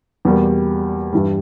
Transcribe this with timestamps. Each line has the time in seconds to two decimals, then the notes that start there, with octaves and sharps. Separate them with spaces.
0.25 E2 B2 G3 A#3
1.13 G2 E3 G3